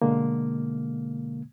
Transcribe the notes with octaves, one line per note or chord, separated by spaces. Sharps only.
B2 D3 G#3 A#3